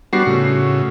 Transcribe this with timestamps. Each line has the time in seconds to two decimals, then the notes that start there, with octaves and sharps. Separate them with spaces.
0.13 G3 B3 D4 F#4 C7
0.26 A2 C#3